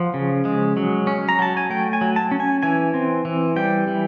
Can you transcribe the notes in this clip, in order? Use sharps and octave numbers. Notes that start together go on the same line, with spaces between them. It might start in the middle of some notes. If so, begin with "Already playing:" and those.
Already playing: F3 F#5
C#3
G#3
F#3
C#4
A#5
F#3 A5
G#5
A3 G5
G#5
F#3
A5
C#4
G#5
E3 G#5
C4
E3
G3 G5
E3